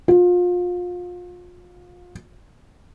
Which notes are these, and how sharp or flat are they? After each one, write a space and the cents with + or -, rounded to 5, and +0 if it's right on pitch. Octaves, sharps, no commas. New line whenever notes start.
F4 +30